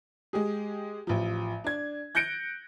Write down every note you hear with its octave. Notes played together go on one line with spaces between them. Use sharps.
G#3 G4 G#4
A1 F3
D4 G#6
F#6 G6 A#6 C#7 D7